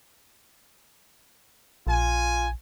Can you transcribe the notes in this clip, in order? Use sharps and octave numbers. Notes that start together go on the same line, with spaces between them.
A#1 F4 G#5